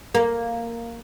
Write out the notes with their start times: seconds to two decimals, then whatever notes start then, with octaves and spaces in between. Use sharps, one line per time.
0.15 A#3